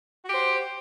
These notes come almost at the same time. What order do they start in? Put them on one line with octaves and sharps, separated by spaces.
F#4 G4 C5